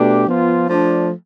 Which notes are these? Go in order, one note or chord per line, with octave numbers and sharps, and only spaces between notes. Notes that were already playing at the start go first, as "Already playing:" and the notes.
Already playing: B2 A3 D4 G4
F3 B3 F4
F3 A3 D4